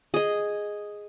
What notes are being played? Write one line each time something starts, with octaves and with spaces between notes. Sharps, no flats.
G#4 D#5